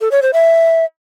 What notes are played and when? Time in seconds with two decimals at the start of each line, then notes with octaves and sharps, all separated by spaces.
0.01 A4
0.11 C#5
0.22 C5
0.33 E5